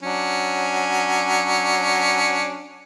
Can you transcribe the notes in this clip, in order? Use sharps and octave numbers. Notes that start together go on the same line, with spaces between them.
F#3 C#4 D4